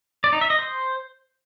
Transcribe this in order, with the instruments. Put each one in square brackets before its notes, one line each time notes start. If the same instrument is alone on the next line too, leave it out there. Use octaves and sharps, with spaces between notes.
[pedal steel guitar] D5
D#4
E5
D#5
C5